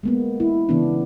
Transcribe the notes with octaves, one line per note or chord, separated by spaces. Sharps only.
G#3 A#3 B3
E4
C#3 E3 B3 D4